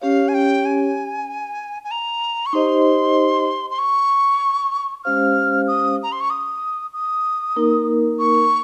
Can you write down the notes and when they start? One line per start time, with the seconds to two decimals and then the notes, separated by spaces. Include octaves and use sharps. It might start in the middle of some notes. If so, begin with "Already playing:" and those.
0.02 C#4 G4 C#5 F5
0.28 G#5
0.34 G5
0.65 G#5
1.84 G#5
1.91 A#5
2.46 C#6
2.53 D#4 G4 C5 D#5 C6
3.70 C6
3.79 C#6
5.05 G#3 C#4 G4 C5 F5 F6
5.68 D#6
6.03 A#5
6.12 C6
6.21 C#6
6.30 D#6
6.94 D#6
7.56 A#3 D#4 A#4
8.19 C#6